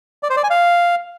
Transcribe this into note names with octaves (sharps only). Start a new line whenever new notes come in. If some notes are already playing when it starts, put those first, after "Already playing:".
D5
C5
D5
G#5
F5